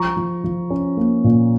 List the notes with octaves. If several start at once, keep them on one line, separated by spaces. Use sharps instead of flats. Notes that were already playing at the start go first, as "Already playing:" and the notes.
Already playing: F3 A#5 C#6
F3
F3
C#4
A#3
A#2